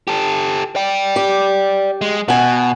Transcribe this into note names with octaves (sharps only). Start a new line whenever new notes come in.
G4 A4
D5 G5
G4
G#3
B2 F#5 G#5